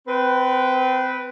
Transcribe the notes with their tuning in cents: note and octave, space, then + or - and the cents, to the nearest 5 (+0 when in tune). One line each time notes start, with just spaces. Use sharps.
C4 -25 B4 +0